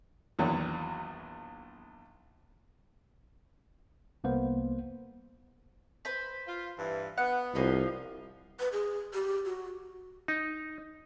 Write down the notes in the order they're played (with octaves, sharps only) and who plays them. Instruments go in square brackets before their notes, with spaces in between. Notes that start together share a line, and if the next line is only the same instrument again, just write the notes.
[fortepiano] A#1 E2 D#3 F#3
[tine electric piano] C2 A#3 B3 C5
[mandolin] B4 C5 B5
[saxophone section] F4
G2 E3
[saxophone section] B3 [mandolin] F#5
[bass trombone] C2 [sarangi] F3 [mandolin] A#3 D#5 B5
[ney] B4
G#4
G4
F#4
[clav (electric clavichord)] D#4